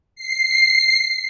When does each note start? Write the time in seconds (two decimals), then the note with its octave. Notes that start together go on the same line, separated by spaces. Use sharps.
0.16 C7